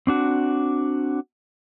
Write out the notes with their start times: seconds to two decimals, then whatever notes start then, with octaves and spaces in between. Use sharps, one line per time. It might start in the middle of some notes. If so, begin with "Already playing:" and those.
0.07 C4 D4 F#4